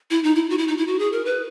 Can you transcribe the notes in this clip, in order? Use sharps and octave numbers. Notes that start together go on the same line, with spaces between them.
E4
D#4
E4
F#4
E4
D#4
E4
F#4
G#4
A#4
B4